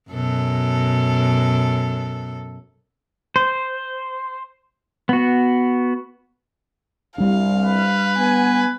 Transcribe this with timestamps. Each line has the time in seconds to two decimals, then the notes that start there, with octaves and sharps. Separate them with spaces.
0.10 F#2 B2 A4
3.36 C5
5.09 B3 F#4
7.18 C2 G3 D4 F5
7.64 B4
8.17 B3 G#5